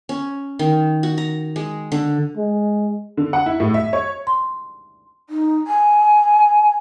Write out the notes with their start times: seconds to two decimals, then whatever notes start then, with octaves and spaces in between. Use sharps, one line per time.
0.09 C#4
0.59 D#3
1.03 F#4
1.18 A#5
1.56 G#3
1.92 D3
2.37 G#3
3.17 D3
3.33 F#5
3.46 E4
3.60 A2
3.74 E5
3.93 C#5
4.27 C6
5.29 D#4
5.67 G#5